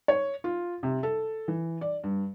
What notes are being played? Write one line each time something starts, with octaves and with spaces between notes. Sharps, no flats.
C#5
F4
C3
A4
E3
D5
G2